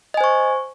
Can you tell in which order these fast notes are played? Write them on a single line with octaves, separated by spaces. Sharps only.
D#5 G#5 C5 C#6